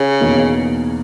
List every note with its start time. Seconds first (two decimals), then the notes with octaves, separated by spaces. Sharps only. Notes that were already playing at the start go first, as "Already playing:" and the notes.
Already playing: C#3
0.21 E2 B2 A#3 D#4